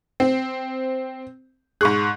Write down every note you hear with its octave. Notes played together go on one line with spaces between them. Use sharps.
C4
G#2 G#4 C#6 F#6